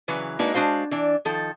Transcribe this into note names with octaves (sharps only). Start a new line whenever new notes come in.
C#3 E3 F#3 B4
G#3 A#3 D4 D#4 F#4 B4
G#3 D4 F#4 C5 F5
E3 D4
D#3 F3 A4